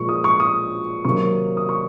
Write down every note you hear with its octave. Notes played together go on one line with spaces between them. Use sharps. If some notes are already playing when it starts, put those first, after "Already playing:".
Already playing: A#2 F3 G#3 C#6
D#6
C#6
D#6
C3 D#3 F#3 A#3 C#6
D#6
C#6